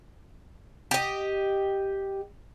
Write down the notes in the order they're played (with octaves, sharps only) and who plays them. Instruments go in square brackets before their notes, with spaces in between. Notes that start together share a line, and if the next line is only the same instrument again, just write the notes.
[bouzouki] G4 D#5